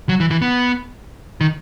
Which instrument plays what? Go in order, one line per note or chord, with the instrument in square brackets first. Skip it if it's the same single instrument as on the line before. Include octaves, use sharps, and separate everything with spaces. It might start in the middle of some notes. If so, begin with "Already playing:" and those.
[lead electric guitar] F#3
E3
E3
B3
D#3